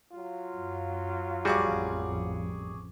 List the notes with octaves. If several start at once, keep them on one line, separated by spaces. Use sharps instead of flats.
F#3 F4
F#2
A1 F2 G3 F#4 G#4 C#6 D6